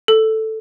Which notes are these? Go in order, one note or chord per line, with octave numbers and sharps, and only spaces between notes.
A4